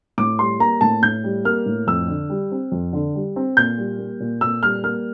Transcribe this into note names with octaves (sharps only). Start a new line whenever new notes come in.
A2 D6
G3 C6
A#3 A#5
A2 A5
A2 G6
G3
A#3 F6
A2
F2 E6
D3
G3
C4
F2
D3
G3
C4
A#2 G6
G3
A#3
A#2
A#2 E6
G3 F6
A#3 F6